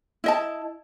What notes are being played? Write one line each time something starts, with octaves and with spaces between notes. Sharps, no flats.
E4 D#5 A5